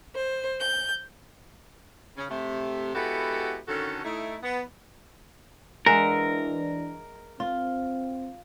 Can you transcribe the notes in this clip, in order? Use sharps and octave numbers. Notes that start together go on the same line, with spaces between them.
C5
G6
C#3 C#4
C3 A3 G4
G#3 B3 E4 F#4 G4 A4
D3 D#3 C#4 F#4 A4
A3 D#4 E4
B3
E3 G#3 D4 A#4 E5 F#5
C4 F4